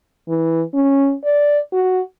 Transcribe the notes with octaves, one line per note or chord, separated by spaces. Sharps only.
E3
C#4
D5
F#4